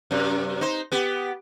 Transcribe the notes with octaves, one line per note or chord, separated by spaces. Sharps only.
F#2 C3
D#4 C5
B3 G4